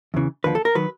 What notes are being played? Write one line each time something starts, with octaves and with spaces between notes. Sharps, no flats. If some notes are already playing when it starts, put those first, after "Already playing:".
E2 C#3 E3
D#2 D3 F3 B4
A4
A#4
D#3 F#3 B4